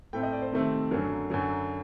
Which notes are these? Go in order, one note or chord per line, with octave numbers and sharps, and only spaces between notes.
A2 A3 C4 G5
D#5
D5
C5
C3 D#3 A3 C4
F#2 D3 F#3 A#4
F#2 D3 F#3